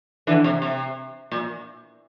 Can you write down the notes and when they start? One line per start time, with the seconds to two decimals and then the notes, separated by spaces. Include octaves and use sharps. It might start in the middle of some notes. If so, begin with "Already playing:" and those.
0.27 D3 E3
0.44 C3
0.62 C3
1.31 A#2